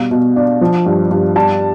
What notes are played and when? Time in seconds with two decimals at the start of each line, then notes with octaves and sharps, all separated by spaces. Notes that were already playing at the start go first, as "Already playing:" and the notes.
Already playing: B2 G3 F5
0.11 B2
0.36 D4
0.61 F3
0.86 G2
1.11 G2
1.35 G3 A5